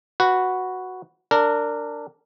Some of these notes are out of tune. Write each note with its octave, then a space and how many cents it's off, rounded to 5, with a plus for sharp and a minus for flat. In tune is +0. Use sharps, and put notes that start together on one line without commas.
F#4 +0 B4 +0
D4 -5 A#4 -20